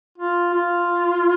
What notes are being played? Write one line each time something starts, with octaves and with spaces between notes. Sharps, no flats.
F4
F4